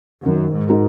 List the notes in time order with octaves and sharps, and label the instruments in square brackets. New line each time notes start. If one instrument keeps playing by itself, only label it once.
[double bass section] F#2 [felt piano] D#3
[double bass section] G#2
[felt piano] G#3 D#4 F#4 A#4